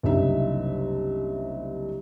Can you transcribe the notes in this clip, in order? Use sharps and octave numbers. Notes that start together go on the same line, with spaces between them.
F#1 C2 C3 D4 D#4 E5